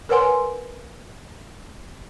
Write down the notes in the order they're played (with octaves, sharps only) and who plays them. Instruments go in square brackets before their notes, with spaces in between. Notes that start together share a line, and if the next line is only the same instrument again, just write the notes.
[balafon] A#4 B4 C#5 F#5 G#5 C6